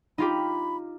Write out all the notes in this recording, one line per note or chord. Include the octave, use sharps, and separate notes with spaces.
D#4 F4 G4 B5